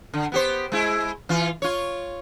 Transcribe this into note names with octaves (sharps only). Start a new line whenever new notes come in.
D3
B3 G4 C5
G#3 E4
E3 F4
F4 C#5